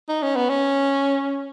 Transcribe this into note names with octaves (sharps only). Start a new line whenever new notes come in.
D#4
C#4
B3
C#4